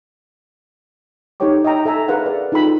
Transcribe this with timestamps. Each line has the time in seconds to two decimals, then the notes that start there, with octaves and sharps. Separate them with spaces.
1.40 D#4 G4 A4 C#5 G5 D6
1.65 D#5 E5 G5 A#5
1.86 A4 E5 G#5 A#5
2.08 G#4 A#4 B4 F5 F#5
2.26 D5
2.52 D#4 F4 A4 G5 B5